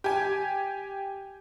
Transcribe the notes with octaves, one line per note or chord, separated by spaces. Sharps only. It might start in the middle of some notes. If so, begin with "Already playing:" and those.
G4 G#5